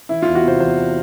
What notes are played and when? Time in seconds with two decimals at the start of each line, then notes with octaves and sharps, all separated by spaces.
0.09 E3 E4
0.22 E2 F4
0.35 F#4
0.44 C3 C5
0.60 E2 C5